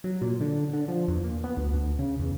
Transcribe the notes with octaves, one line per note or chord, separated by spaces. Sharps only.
F#3
A#2
D3
D3
F3
E2
A#2
B3
D2
D2
C#3
E2